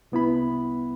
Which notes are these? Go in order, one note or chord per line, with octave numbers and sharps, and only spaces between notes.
C2 B3 E4 B5